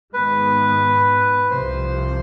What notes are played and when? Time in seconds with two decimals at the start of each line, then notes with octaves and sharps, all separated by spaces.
0.14 G#2 D#3 G#3 B3 B4
1.50 C2 C3 F3 C5